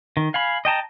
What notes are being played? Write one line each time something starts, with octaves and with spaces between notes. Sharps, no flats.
D#3
F5 G#5 B5
D#5 G5 A5 A#5